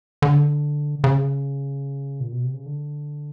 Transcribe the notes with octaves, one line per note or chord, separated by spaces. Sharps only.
D3
C#3
A#2
B2
C3
C#3
D3